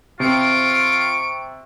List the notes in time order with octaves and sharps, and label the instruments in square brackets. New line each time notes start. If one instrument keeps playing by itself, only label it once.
[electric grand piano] C3 C4 C#7 [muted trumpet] F4 [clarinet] C#6 [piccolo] D7